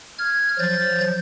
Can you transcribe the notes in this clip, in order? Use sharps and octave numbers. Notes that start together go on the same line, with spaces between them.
F6 G#6
F3 F#3 G6 A6